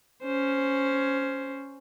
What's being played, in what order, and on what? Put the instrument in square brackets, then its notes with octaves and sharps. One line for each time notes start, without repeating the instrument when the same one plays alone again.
[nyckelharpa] C#4 C5